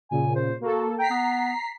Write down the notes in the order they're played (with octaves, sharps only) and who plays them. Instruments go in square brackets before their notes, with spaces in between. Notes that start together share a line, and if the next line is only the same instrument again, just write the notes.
[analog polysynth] A#2 C#3 [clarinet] G#5
[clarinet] C5
[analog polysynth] A#3 A4 [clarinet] F#4
[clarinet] G5 [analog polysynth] A#5 B6 C7
[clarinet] B3